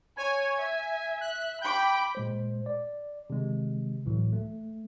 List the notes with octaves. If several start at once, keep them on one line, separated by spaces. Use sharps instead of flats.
C#5 G#5
E5
F#6
G5 B5 D6
A#2 G#3 C5
D5
C3 D#3 G#3
C#2 A2 E3 F#3
A3